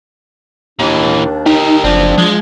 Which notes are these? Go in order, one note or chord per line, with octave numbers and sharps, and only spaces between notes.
D#2 A#2 E3 D4
D#4 G4 A#4
F#1 F3 C4 D4
F3 G#3